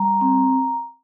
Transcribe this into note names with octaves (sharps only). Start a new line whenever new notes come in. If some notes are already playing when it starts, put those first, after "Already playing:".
Already playing: G3 A#5
C4